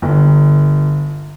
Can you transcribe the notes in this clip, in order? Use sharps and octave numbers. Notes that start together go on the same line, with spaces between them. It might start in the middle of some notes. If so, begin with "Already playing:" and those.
G1